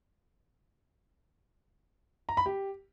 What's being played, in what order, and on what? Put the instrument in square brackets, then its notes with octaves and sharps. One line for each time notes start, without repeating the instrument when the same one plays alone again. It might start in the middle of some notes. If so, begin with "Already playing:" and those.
[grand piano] A#5
B5
G4